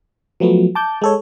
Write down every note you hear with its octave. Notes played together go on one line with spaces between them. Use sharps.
F3 F#3 A3 B3
A5 D6 G6
G#3 A4 C#5